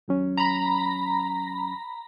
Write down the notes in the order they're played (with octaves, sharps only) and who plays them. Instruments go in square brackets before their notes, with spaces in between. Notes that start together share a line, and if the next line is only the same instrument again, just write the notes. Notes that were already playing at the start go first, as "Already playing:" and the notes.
[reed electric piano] D#2 F#3 C#4
[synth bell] A#5 B5